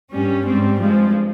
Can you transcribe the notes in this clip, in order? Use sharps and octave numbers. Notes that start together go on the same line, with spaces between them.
G2 G3 C#4
G#2 G3 C4
G2 F3 G#3